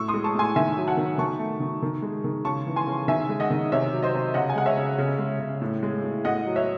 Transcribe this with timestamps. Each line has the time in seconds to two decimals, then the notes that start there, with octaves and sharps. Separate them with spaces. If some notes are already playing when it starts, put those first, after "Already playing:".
Already playing: A2 C#6 E6
0.08 C6 D#6
0.14 G#3
0.24 A5 C#6
0.34 A2 G#5 C6
0.56 D#3 E5 G#5
0.77 F#3
0.87 F#5 A5
0.97 D#3
1.18 D#3 A5 C#6
1.39 A3
1.60 D#3
1.82 D#3
2.02 G#3
2.24 D#3
2.45 C#3 A5 C#6
2.67 E3
2.76 G#5 C6
2.87 C#3
3.08 D#3 E5 G#5
3.29 G#3
3.40 D#5 F#5
3.50 D#3
3.72 C3 C#5 E5
3.93 F#3
4.03 C5 D#5
4.14 C3
4.34 C#3 D#5 F#5
4.50 G#5
4.55 G#3 F#5
4.66 C#5 E5
4.77 C#3
4.98 C#3
5.19 G#3
5.39 C#3
5.61 A2
5.83 G#3
6.04 A2
6.25 A2 D#5 F#5
6.46 F#3
6.56 C#5 E5